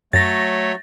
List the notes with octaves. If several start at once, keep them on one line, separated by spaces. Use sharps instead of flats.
F#2 F#3 A3 C#5 A6 A#6